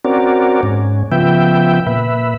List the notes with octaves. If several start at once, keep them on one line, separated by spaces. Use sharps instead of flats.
C4 C#4 F#4 A#4 D5
G#2 C#4
C#3 F3 B3 E5 G5
A#2 B4 E5